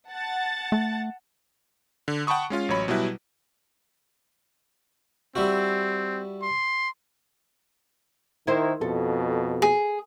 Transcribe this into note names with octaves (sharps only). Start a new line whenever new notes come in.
F#5 A5 A6
A3
D3
F#5 G5 A5 B5 C#6 D#6
G#3 C#4 F4 F5
A1 F#3 C#5 B5
B2 F#3 G3 E4 B4
G3 C4 E4 F#4
C6
D#3 E4 A#4 C5
F2 B2 A4
G#4